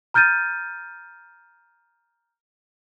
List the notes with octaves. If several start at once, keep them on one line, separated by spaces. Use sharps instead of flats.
A#5 F6 G6 A6 D#7